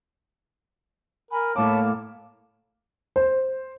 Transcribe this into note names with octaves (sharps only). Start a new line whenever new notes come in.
A#4 G#5 B5
A2 A#3 E4 C#5 A5 D6
C5